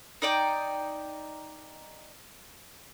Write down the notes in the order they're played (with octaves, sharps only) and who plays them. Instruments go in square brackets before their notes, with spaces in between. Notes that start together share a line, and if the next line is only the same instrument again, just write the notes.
[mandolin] D#4 D5 G5